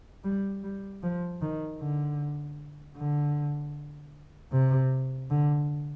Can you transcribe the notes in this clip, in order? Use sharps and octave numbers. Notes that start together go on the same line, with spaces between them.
G3
G3
F3
D#3
D3
D3
C3
D3